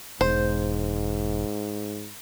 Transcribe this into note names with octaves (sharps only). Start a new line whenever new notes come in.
E1 G#2 C5